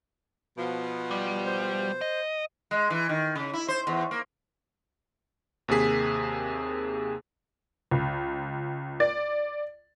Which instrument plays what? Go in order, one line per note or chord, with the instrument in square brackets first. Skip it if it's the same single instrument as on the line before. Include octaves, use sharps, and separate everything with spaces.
[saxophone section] B2 F3
[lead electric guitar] G3
[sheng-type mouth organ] C5
[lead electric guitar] D#5
[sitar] G#3
E3
D#3
C#3
E4
C5
E2
A#3
[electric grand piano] D#2 C3 A#3 G#4 B6
[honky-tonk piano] C#2
D5